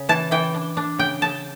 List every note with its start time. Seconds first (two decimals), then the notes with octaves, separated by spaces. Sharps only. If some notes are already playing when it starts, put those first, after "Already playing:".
Already playing: C#3
0.09 E3 A5
0.31 E3 G5
0.54 D4
0.77 D4
0.99 C#3 G5
1.21 C#3 A5